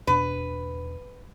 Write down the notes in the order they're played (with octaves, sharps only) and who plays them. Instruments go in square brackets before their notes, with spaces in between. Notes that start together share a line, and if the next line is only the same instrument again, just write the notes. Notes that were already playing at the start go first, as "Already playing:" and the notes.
[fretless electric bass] E2 B2 D4 [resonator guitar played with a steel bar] B4